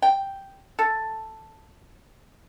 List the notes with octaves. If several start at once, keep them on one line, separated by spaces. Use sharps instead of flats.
G5
A4